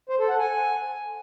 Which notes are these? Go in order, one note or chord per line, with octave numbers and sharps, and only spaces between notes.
C5
A4
F#5
G#5